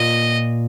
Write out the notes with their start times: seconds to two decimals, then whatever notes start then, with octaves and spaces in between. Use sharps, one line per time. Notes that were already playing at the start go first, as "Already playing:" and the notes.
Already playing: A#2 D#5